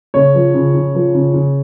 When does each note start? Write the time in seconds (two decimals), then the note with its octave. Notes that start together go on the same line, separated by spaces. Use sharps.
0.14 C#3 C#5
0.34 F3
0.54 C#3
0.74 C#3
0.95 F3
1.14 C#3
1.34 C#3